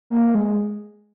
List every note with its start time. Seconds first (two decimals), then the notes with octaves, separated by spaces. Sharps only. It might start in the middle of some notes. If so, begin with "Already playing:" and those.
0.10 A#3
0.35 G#3